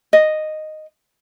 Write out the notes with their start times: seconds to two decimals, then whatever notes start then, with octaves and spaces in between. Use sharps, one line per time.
0.13 D#5